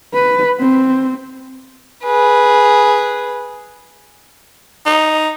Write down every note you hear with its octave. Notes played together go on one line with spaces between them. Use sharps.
B4
C4
G#4 B4
D#4